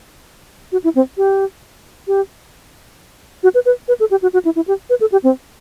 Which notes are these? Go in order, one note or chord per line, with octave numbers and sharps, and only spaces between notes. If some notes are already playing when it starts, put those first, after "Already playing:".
F#4
E4
C4
G4
G4
F#4
B4
B4
B4
A4
G4
F#4
F#4
E4
E4
G4
B4
A4
G4
C4